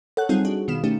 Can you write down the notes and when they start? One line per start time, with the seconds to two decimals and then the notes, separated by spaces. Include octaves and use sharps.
0.17 A4 C#5 F#5 F#6
0.29 F#3 G3 C4 D#4 F4 G#4
0.45 D4 F#4
0.68 B2 D#3 B3 F5 E7
0.84 A3 C#4 D#4 G4